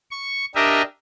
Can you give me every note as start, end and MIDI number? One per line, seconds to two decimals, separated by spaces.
0.11 0.45 85
0.55 0.82 62
0.55 0.82 67
0.55 0.82 70
0.55 0.82 75
0.55 0.82 76